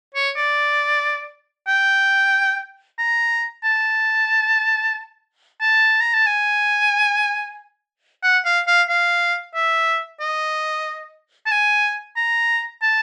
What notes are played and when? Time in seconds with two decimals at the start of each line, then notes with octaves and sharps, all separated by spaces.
0.15 C#5
0.37 D5
1.67 G5
2.99 A#5
3.64 A5
5.61 A5
6.01 A#5
6.14 A5
6.26 G#5
8.23 F#5
8.45 F5
8.67 F5
8.89 F5
9.54 E5
10.20 D#5
11.46 A5
11.51 G#5
12.17 A#5
12.83 A5